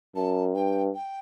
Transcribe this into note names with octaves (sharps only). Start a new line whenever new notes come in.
F#2 A5
G2 G5
G5